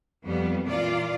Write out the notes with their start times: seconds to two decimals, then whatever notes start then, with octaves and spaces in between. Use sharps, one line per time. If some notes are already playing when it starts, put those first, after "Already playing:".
0.24 F2 G3 B3
0.65 A#2 E3 F4 D5